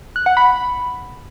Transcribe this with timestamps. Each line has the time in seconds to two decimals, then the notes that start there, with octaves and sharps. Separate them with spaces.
0.16 F#6
0.26 F#5
0.37 B5